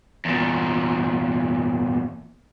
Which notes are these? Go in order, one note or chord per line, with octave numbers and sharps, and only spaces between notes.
E2 A#2